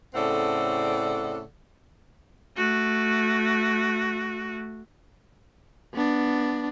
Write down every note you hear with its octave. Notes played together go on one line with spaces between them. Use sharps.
A2 C#3 C4 A4 D5 F#5
A3 F#4
B3 D4